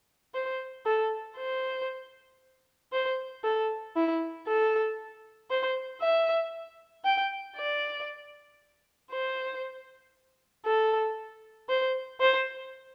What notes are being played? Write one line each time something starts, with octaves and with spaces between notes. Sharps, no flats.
C5
A4
C5
C5
A4
E4
A4
C5
E5
G5
D5
C5
A4
C5
C5